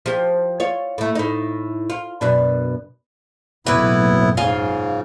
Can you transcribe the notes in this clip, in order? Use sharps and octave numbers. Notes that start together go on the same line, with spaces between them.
F3 G4
F4 C#5
A2 A3
A2 D#4
F4
F#2 B2 D4
F#1 B1 A2 E3 B3 E4 B4
G#2 C#3 F4 F5 G#5